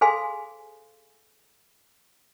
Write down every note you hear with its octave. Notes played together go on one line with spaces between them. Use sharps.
G#4 A4 C5 F5 G#5 C6